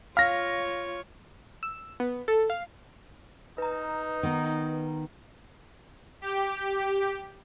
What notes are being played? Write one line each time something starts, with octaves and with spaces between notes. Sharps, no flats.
F4 C#5 F5 F6 A#6
E6
B3
A4
F5
D#4 B4 A#5
D#3 B3
G4